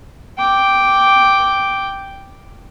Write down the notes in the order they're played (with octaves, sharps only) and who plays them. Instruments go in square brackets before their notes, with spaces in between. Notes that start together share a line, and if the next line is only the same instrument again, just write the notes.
[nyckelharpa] G5 D6